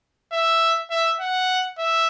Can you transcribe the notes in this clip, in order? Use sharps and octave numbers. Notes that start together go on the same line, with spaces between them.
E5
E5
F#5
E5